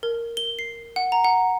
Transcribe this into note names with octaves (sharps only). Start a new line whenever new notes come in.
A#4
G7
C7
F#5
A#5
F#5